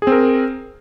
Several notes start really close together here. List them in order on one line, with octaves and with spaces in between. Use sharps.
G#4 C4 A#4